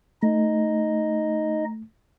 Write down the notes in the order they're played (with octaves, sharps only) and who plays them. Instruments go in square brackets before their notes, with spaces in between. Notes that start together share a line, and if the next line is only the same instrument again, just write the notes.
[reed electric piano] A3 [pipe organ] D#4 D#5